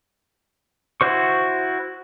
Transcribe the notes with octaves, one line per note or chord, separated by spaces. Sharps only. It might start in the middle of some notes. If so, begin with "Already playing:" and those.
E4 F#4 C5 C#6